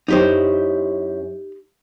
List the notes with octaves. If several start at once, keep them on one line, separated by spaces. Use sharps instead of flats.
F#2 D#4 E4 G4 C5 C#5